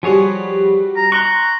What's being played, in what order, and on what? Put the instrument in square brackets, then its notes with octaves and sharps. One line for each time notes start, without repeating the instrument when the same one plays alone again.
[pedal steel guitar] F3 G#4 C#5 [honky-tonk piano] G3 F#4
[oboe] A#5
[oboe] A#5 [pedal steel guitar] C6 C#6 [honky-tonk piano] F#6